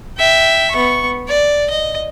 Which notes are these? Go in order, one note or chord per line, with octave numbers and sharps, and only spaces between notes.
E5 G5
B3 C#6
D5
D#5